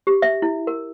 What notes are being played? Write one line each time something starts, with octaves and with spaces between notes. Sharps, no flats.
G4
E5
E4
A#4